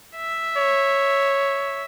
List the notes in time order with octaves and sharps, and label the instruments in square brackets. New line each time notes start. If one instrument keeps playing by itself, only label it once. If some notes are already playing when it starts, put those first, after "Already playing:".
[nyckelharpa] E5
[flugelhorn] C#5